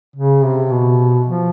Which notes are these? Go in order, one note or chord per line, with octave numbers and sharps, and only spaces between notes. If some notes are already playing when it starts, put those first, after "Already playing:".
C#3
C3
B2
F3